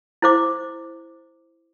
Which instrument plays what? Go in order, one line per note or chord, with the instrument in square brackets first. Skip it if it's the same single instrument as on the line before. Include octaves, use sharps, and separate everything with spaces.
[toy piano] E4 C5 D6